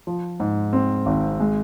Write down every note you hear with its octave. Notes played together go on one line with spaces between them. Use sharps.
F3
G#2
C4
G#1
G#3